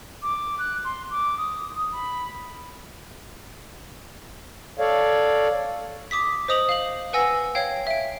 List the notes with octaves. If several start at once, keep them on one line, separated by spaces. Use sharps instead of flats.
D6
F#6
C6
D6
D#6
B5
A4 C#5 D5 F5
D6 D#6 B6
C5 D#5 D#6 F7 F#7
F5 F#7
B4 F#5 G#5 E6 A#6
C#5 F5 G5
E5 D7